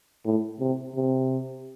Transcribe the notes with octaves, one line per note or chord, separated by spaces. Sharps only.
A2
C3
C3